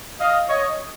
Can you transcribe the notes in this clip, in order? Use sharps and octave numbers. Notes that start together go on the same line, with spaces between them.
D#5 F5
C#5 D#5